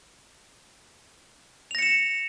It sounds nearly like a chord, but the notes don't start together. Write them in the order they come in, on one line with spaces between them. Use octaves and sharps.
F7 A#6 C#7 E7